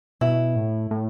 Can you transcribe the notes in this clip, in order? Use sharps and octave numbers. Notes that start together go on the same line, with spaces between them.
B2 E4
A2
A2